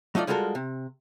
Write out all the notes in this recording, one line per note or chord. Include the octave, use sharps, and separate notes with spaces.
F#3 A3 D#4 F4 D5
G3 G#3 F4 F#4 A4 A#4
C3